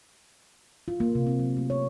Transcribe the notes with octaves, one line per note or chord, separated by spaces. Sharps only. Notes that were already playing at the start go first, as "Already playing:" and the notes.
F4
A#3
C3
C4
F#3
A3
C#5